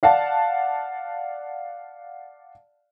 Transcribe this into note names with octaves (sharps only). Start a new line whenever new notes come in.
D5 F5 F#5 A5